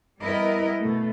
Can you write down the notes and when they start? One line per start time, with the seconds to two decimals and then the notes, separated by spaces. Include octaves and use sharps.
0.19 G3 B3 E4 A#4 D#5
0.80 B2 A3